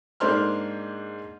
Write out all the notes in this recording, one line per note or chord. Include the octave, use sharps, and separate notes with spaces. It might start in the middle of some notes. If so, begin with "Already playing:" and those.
G#2 A#3 D4 C5 C6 F6